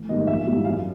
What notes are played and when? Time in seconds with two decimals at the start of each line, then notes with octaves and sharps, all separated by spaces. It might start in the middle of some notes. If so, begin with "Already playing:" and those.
Already playing: A1
0.09 G#2 D#3 G3 A#3 D#5
0.27 A#1 E5
0.47 G#2 E3 G3
0.65 F#2 F5